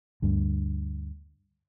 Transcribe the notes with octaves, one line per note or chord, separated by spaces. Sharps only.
D2 G2